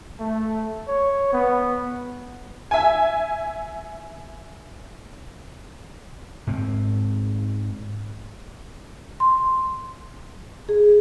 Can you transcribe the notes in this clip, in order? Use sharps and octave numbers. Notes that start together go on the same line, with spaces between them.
A3
C#5
B3
E5 G#5
G#2 C4
C6
G#4